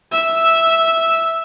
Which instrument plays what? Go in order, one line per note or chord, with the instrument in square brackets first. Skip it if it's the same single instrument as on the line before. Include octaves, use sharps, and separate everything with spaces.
[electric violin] E5